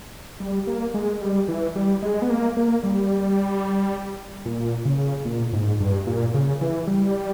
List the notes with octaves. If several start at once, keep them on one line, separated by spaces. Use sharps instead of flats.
G3
A#3
G#3
G3
E3
G3
G#3
B3
A#3
A#3
G3
A#2
C#3
A#2
G#2
G2
A#2
C#3
E3
G3